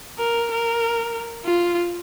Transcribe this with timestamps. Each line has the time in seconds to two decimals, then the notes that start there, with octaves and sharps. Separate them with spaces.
0.19 A#4
0.51 A#4
1.44 F4